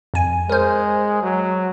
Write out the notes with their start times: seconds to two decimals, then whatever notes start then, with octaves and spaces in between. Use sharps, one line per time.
0.14 F2 G#5
0.50 G#3 A#4 C5
1.22 F#3